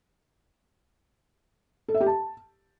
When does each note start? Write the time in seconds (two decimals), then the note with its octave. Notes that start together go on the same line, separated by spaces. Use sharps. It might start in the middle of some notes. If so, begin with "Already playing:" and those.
1.89 A4
1.94 E5
2.00 G4
2.06 A5